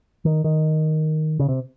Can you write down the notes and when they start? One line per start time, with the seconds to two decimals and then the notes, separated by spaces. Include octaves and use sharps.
0.25 D#3
0.44 D#3
1.39 C#3
1.49 C3